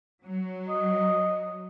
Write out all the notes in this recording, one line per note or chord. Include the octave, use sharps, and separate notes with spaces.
F#3
D#5